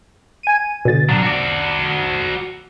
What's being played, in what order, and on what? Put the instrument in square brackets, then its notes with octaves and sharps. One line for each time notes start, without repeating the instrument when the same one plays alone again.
[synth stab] G#5 D#7
B2 D3 A6
[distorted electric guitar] F#3 D4
F#4 D5